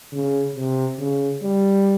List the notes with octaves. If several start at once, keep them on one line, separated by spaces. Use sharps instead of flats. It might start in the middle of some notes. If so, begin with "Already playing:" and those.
C#3
C3
C#3
G3